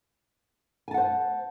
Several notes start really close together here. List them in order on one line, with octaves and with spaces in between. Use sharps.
G#5 A5 F#5 C5